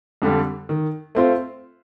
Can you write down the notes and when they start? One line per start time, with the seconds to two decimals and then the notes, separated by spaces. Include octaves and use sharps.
0.22 F2 D3 G3
0.69 D#3
1.15 A3 C4 F4 C5